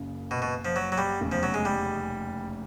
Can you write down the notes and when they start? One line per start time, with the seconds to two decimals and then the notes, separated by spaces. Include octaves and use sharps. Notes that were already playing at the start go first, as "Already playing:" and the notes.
Already playing: F#1 F#2 C#3
0.31 B2
0.42 B2
0.65 F3
0.76 F#3
0.92 F#3
0.98 G3
1.21 F1 E2 C#3
1.32 F3
1.43 F#3
1.54 G#3
1.65 G3